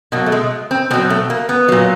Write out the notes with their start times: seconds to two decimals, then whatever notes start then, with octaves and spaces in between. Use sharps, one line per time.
0.12 B2 F#3 A#3
0.26 A3
0.32 G#3
0.71 C4
0.91 B2 F#3 C4
1.10 A3
1.30 A#3
1.49 B3
1.68 A#2 F#3